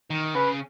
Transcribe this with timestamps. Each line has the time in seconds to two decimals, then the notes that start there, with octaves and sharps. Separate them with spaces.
0.10 D#3
0.35 C#3 B4